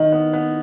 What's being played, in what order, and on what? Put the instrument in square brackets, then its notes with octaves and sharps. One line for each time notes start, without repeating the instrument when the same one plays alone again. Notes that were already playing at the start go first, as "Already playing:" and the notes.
Already playing: [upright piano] D#3 [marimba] D#5
[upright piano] B3
B3